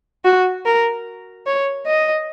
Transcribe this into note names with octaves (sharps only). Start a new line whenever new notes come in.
F#4
A#4
C#5
D#5